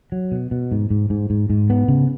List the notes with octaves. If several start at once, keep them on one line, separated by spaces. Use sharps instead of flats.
F#3
B2
B2
G#2
G#2
G#2
G#2
G#2
B3
C#3